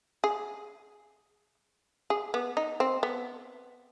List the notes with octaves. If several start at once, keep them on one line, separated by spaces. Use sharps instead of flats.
G#4
G#4
B3
D#4
C4
B3